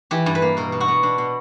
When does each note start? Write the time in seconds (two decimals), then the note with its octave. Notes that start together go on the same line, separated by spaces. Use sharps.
0.11 E3 G4
0.26 G2
0.35 B4
0.42 A#3
0.57 B2 A#4
0.72 B2
0.80 F#4
0.88 B3
1.03 B2 D4
1.18 B2